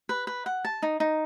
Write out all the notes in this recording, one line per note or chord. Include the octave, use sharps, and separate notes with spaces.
B4
B4
F#5
A5
D#4
D#4